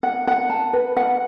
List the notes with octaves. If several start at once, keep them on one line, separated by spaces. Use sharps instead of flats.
F#5
F#5
A5
B4
F#5